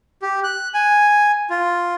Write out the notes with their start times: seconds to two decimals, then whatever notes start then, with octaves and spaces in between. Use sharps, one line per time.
0.22 G4
0.44 F#6
0.74 G#5
1.50 F4